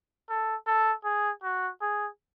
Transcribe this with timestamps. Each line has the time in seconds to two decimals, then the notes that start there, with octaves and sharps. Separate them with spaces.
0.29 A4
0.66 A4
1.04 G#4
1.43 F#4
1.81 G#4